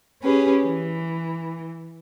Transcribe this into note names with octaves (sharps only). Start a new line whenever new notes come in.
C#4 G4 G#4 B4
E3